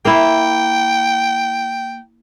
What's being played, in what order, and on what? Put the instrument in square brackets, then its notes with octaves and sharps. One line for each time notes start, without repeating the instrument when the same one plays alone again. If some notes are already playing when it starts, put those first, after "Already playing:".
[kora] A#3 E4 [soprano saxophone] G5